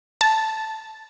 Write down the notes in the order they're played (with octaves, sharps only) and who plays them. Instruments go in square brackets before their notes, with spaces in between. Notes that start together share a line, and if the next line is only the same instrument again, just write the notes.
[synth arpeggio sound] A5